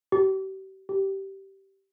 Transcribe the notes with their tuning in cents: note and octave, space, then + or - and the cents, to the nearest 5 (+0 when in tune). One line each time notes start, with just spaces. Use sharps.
G4 -40
G4 -15